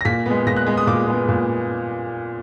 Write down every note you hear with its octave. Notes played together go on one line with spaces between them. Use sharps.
A#6
A#2 B6
G#3 B3
A#2 A#6
F#6
G#3 B3
D#6
A#2 D6
G#3 B3
A#2